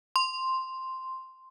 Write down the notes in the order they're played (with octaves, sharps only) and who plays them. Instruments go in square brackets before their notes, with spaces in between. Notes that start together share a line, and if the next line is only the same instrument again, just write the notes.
[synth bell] C6